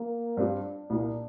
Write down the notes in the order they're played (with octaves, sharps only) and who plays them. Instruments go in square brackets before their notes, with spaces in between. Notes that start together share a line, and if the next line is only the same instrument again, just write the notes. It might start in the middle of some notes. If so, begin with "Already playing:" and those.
Already playing: [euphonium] A#3
[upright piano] G2 G3 C4 F4 [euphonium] D4
[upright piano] C2 A#2 A#3